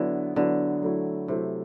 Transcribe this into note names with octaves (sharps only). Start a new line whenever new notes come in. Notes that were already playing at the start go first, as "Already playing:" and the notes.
Already playing: D3 F#3 B3 E4
D3 F#3 B3 E4
F#3 A3 E4
C3 F#3 A3 E4